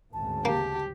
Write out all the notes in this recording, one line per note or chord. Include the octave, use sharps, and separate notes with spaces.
G#1 D2 C#3 A5
A#3 G4